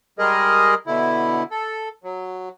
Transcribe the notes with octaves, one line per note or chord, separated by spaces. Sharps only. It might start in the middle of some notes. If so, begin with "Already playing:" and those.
G3 G#3 G#4 A#4 D#5
B2 D3 E4
A4
F#3